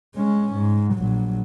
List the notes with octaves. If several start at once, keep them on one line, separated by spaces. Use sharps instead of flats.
G#3 C#4
G#2
A#1 F#3